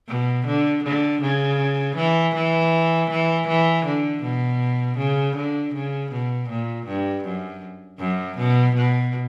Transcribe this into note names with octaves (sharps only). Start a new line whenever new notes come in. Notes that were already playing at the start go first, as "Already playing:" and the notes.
B2
D3
D3
C#3
E3
E3
E3
E3
D3
B2
C#3
D3
C#3
B2
A#2
G2
F#2
F#2
B2
B2